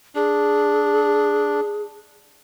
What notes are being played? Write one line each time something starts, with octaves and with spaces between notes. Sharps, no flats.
D4 G#4